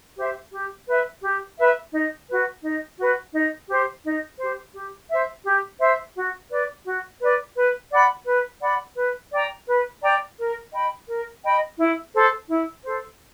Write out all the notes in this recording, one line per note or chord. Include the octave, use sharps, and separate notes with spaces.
G4 C5 E5
G4
B4 E5
G4
B4 E5
D#4
F#4 B4
D#4
F#4 B4
D#4
G4 C5
D#4
G4 C5
G4
C5 E5
G4
C5 E5
F#4
B4 D5
F#4
B4 D5
B4
D5 F#5 B5
B4
D5 F#5 B5
B4
D5 G5 A#5
B4
D5 G5 A#5
A#4
D#5 G5 B5
A#4
D#5 G5 B5
E4
A4 C5
E4
A4 C5